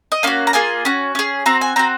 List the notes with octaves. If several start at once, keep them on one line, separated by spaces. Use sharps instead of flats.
D#5
A#3 C#4 F#4 F5
A#5
A#3 F4 G#4 G#5
C#4 F#4
C#4 G#4
C4 F#4 A#5
G#5
C4 F#4 A#5